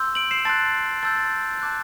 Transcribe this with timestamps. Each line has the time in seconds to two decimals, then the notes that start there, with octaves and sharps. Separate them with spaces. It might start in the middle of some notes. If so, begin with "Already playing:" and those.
Already playing: C6 E6 G6
0.15 D7 F#7
0.31 C7 E7
0.45 A5 C6 F#6 A6 C7
1.03 A5 C6 E6 G6 A6
1.17 A6
1.61 A5 D6 F#6